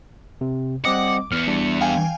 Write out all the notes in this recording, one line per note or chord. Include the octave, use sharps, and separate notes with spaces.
C3
G3 C4 D#5 F#5 D6
E2 F6 C#7
G3 D4
F5 G5 G#5